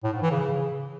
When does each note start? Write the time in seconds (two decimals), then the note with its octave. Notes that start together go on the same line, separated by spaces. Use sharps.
0.04 A2
0.13 G#2
0.22 E3
0.31 C#3